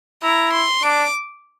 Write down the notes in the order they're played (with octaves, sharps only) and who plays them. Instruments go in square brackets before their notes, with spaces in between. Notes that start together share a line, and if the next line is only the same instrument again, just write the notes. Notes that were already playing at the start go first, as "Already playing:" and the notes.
[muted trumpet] E4 [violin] A#5
[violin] C6
[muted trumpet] D4 [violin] D6